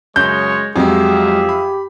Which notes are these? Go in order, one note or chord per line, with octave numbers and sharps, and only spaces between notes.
F#2 C#3 G#3 C#5 G6
F2 F#3 G#3 G4 G#4 E5 F5
B5